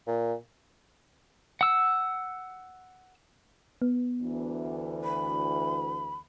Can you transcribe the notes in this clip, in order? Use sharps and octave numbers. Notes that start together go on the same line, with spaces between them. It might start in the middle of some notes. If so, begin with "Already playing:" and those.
A#2
F#5 E6
B3
D2 E3
B5